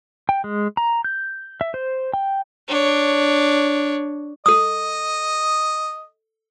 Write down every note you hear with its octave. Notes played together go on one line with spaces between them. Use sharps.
G5
G#3
A#5
G6
E5
C5
G5
D4 C#5
A4 D#5 D#6